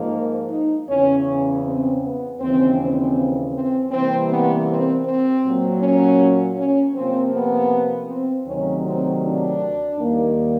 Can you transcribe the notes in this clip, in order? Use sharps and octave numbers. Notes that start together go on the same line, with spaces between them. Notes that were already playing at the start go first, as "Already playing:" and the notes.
Already playing: G#2 F3 A#3
D#4
E2 C#3 E3 C#4
C#4
C4
B3
D#2 C#3 E3 C4
C4
C4
C3 E3 G3 A#3 C4
B3
C4
C4
A#2 F#3 A#3
C#4
C#4
C3 F3 A#3 C4
B3
C4
D2 C3 D#3 F#3 C#4
C4
D4
D#2 D#3 G3 A#3